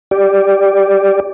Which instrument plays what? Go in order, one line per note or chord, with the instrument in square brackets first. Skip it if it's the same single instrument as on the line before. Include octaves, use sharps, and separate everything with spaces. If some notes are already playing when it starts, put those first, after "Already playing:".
[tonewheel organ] G4 D5